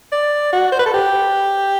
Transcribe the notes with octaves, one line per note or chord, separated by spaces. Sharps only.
D5
F#4
C5
B4
A4
G4